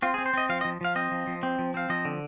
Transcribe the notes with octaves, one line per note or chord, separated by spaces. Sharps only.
C4 F4
G#4
C4
C5
C4 D#5
F3 F5
D#5
F3
F3 F5
C4 D#5
F3
F3
C4
F3
C4 F5
F3 D#5
D3